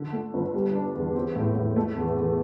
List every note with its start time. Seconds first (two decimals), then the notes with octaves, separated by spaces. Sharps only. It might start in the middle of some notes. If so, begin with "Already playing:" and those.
Already playing: D3
0.13 A3
0.34 G1
0.54 G3
0.74 D4
0.95 E2
1.15 C4
1.36 A2
1.56 A2
1.76 A3
1.96 E2
2.17 E2